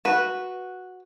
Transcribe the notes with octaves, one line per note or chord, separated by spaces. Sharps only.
F#4 B4